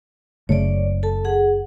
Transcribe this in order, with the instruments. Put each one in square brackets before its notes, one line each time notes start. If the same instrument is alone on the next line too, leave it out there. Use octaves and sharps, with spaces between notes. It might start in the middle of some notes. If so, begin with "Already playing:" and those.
[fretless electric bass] F#1 C#3 A3 [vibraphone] C#5 D5
[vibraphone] A4 A5
G#4 F#5